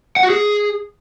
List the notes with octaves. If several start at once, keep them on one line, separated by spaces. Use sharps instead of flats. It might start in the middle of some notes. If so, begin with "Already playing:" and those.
F#5
F#4
G#4